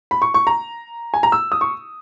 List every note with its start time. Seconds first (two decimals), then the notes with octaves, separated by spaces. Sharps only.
0.11 B5
0.22 C#6
0.34 C#6
0.47 A#5
1.14 G#5
1.23 A#5
1.32 E6
1.52 D#6
1.61 C#6